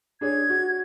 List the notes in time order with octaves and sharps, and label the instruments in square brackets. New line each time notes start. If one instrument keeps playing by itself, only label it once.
[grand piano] D4 G#4 C#5 [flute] G#6
[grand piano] F#4